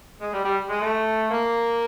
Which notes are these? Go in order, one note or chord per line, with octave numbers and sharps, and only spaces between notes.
G#3
G3
G3
G#3
A3
A#3